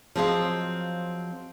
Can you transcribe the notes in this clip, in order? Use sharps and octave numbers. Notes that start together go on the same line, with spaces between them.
F3 F#3 C4 G#4 D#5 F5